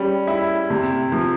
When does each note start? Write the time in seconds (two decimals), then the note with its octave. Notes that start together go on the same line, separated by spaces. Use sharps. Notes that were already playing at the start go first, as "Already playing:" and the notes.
Already playing: G3 C#4
0.27 E4
0.70 C3
1.12 F3